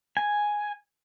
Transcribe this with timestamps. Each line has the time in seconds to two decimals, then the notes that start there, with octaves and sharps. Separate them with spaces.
0.17 G#5